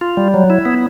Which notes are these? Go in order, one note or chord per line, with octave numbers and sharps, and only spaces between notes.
F4
G3
F#3
E4
B3